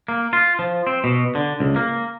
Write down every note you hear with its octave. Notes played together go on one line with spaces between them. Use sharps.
A#3
F4
F3
C4
B2
D3
C#2
A#3